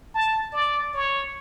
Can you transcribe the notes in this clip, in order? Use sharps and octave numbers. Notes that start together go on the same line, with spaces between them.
A5
D5
C#5